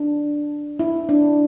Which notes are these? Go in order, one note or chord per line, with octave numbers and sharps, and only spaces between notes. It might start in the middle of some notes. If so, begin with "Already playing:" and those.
Already playing: D4
E4
D4